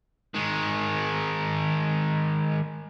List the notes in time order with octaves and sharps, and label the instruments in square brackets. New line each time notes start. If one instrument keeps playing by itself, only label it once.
[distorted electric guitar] D#3 G#3